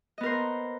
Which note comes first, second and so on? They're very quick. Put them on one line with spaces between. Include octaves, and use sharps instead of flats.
D#5 B3 A#4 C5